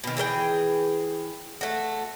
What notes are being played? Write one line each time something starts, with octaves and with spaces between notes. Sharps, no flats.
B2 D#3
E3 G#4 A#4 G5
A3 F#4